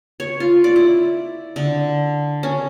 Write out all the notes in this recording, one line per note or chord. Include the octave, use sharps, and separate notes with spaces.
C#5
F4
D5
E4
D3
C#4